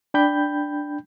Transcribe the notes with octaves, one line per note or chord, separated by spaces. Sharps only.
D4 G5 B5 G6